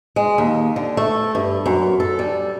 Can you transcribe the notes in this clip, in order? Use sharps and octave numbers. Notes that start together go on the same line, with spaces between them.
G#3
D#2
D3
A3
G2
F#2
A4
G3